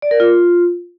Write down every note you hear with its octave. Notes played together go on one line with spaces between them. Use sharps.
D5
A#4
F4